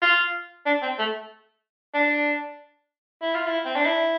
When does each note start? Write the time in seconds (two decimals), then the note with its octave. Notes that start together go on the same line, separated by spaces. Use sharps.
0.02 F4
0.66 D4
0.82 C4
0.98 A3
1.94 D4
3.22 E4
3.34 F4
3.47 E4
3.65 C4
3.76 D4
3.86 E4